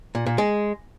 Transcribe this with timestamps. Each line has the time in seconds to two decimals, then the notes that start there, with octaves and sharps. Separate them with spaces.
0.15 A#2
0.26 A#2
0.38 G#3